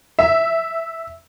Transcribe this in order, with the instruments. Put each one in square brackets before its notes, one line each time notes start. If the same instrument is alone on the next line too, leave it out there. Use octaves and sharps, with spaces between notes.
[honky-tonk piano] E5